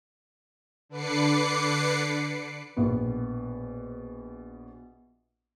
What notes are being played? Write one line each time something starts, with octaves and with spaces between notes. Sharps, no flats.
D3 D4 B4 D6 C7 C#7
A#1 B2 B3